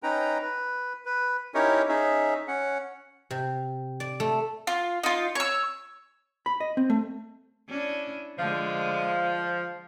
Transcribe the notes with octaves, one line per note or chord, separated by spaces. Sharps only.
C#4 D#4 B4 G5 A#5
B4
B4
C#4 D#4 E4 G4 A#4 C#5
C#4 D#4 G#4 E5
C#4 F#5
C3
D5
A3
F4
D#4 F4
C#5 E6
B5
D#5
C4
A3
C#4 D4 E4
D3 F3 G#3